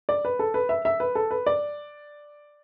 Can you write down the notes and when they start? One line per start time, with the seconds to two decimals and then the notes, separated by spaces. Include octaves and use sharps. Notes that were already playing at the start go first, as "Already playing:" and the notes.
0.09 D5
0.25 B4
0.39 A4
0.54 B4
0.69 E5
0.85 E5
1.00 B4
1.15 A4
1.31 B4
1.46 D5